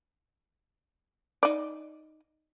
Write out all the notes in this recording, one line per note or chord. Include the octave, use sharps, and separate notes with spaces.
D#4 D5